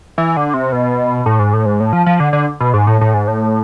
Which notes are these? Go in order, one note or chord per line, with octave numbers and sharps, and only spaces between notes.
E3
D3
C3
B2
A2
G#2
A2
G#2
A2
F3
F3
D3
D3
B2
G#2
A2
A2
G#2
A2